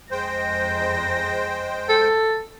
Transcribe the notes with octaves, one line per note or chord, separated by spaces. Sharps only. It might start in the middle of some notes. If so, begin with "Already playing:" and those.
F2 G#3 C5 G5 A#6
A4